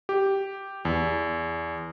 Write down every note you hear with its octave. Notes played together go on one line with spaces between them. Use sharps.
G4
E2